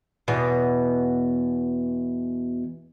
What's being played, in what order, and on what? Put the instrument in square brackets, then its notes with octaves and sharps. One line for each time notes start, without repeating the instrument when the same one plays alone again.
[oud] E2 B2